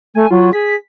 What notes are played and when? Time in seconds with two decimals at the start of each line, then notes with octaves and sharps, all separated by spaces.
0.15 A3 G#5
0.31 F#3 F4
0.53 G#4 B6